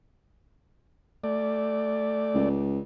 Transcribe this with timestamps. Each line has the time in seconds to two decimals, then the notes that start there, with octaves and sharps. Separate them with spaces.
1.24 A3 D5
2.34 C#2